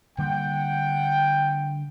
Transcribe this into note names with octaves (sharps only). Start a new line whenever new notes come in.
D3 G3 A#3 F#5 G5